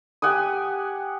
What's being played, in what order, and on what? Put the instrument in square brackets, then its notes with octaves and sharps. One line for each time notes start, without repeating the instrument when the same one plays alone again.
[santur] G4 F#5 G#5 D#6